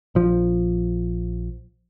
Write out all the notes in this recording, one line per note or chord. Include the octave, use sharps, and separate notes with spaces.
A#1 F3